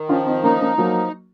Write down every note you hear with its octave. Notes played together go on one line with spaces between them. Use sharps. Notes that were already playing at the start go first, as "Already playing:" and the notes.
Already playing: D#3
F3 C#4 F4
C4 D#4
A#3 C#4 D#4
A#3 C#4
F3 F#3 A#3